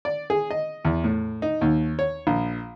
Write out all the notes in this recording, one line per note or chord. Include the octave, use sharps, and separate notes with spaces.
D5
G#4
D#5
E2
A2
D#4
D#2
C#5
A#1